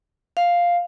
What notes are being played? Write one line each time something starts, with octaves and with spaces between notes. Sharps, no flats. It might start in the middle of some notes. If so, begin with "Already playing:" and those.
F5